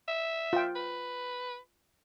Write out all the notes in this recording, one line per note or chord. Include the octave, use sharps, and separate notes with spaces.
E5
F4 G5
B4